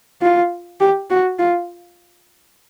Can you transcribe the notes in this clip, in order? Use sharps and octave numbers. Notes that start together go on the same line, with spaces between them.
F4
G4
F#4
F4